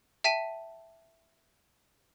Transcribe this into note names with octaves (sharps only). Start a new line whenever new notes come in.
E5 G5 A5 B6 D#7